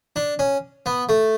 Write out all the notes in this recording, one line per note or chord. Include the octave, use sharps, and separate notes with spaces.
D4
C#4
B3
A3